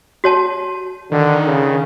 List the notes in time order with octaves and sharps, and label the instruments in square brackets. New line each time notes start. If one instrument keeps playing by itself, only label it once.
[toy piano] F#4 C#5 A5
[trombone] D3 [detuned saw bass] D#3
[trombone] C#3